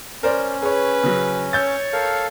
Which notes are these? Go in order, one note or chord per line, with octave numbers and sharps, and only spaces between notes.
C#4 A#4 C5 D5
G#4 B4 C#5
C#3 F#3
C#5 E6 G6 A6
A4 A#4 F5